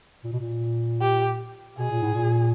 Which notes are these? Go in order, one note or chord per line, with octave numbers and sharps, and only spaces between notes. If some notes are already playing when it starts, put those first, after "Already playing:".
A#2
B2
A#2
G4
B2 G#4
A#2
A2
A#2